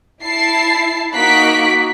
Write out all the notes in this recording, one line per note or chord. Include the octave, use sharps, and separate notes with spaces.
E4 A5 C7
A#3 D#4 F#4 F#6 B6 D7